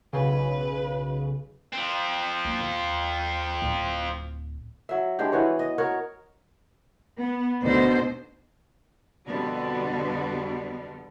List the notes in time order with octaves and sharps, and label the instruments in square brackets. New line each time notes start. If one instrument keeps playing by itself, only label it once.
[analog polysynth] B1 C#3 [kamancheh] B4
[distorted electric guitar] F3 C4
[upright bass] A#3 D4
D#2
D1
[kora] F#3 E5
G2 G#3 D4 G4
E3 B3 F#4 C#5
D#5
F#4 A#4 C#5
[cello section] B3
D2 B2 D3 D#4 C5
F2 B2 D3 G3 B3